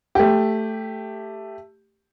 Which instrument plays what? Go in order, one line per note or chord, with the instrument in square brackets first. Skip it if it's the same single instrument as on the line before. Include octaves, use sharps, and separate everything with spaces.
[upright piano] A3 G4